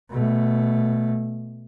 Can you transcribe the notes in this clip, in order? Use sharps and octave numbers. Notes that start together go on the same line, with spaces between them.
B2 A3